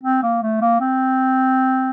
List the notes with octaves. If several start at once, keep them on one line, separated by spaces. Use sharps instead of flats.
C4
A#3
A3
A#3
C4